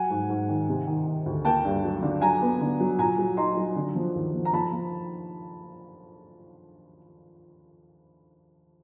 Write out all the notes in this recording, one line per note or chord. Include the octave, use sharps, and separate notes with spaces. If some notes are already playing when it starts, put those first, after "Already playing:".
Already playing: F#3 F#5 G#5
G#2
G#2
D#3
C3
D#3
D#3
D2
A#3 G5 A5
G2
F#3
D3
F#3 G#5 A#5
B3
D3
F#3
A#2 G#5 A#5
F#3
D#4 A#5 C6
F#3
D3
F3
D#2
F3
A#5
F3 A5 B5
F3